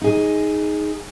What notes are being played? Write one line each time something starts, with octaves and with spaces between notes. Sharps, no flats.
D#4 G#4